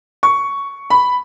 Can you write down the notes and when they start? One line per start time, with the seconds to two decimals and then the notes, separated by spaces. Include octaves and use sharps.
0.23 C#6
0.90 B5